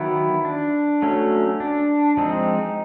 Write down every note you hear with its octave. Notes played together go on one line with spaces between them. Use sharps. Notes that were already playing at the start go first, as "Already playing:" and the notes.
Already playing: D#3 F#3 B3 E4
D4
F#3 A3 C#4
D4
F3 G#3 C4 D#4